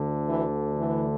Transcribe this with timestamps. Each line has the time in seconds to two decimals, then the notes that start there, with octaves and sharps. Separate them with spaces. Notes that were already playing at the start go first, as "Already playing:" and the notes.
Already playing: D2 D3
0.28 E3
0.76 E3